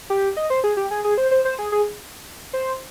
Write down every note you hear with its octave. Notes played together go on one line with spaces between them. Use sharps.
G4
D#5
C5
G#4
G4
G#4
G#4
C5
C5
C5
G#4
G#4
C5